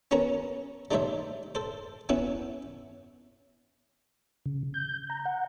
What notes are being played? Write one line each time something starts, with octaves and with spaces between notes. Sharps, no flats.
B3 C#4 F#4 A#4 C#5 A#5
G3 A3 D#4 C5 C#5 E5
A4 C5
B3 C#4 E4 F#4 B4
C#3
G6
A#5
F#5